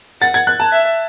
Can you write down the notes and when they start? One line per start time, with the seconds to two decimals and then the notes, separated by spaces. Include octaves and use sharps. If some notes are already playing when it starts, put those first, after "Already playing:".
0.21 F#5 A6
0.34 G#6
0.47 F#6
0.60 A5
0.72 E5